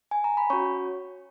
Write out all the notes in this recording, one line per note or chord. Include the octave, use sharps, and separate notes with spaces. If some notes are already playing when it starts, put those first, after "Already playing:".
G#5
A#5
B5
C#4 F#4 C#5 C#6